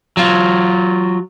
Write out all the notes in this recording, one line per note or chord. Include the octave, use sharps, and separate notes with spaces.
F#3 F4